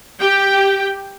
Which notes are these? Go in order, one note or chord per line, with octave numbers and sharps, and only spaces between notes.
G4 G5